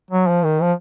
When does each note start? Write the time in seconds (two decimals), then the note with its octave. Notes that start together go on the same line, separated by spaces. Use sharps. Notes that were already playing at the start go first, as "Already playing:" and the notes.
0.11 F#3
0.28 F3
0.44 D#3
0.62 F3